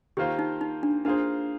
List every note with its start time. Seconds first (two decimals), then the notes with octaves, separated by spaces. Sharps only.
0.17 D#3 A#3 F4 G4 C5
0.39 D#4
0.61 D#4
0.83 D4
1.05 A#3 D4 F4 G#4 C5